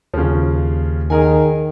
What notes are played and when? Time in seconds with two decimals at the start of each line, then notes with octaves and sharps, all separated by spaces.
0.14 D#2 C#3 F3
1.10 D#3 G#4 A#4 G#5